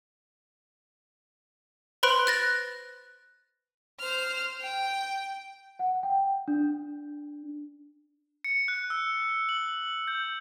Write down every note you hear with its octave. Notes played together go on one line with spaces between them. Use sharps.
B4 C5 B5 C6 F#6 D7
F#6 A6 A#6
C5 F6
G5
F#5
G5
D4
C#7
F#6
E6
F#7
G6